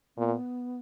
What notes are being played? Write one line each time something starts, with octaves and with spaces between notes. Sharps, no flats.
A#2 B3